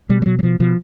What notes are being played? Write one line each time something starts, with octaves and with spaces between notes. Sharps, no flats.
B2 G3
G3
B2 F#3
F#3
B2 F3
B2 F3